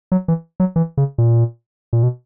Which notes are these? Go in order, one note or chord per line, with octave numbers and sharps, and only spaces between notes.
F#3
E3
F#3
E3
C#3
A#2
A#2
B2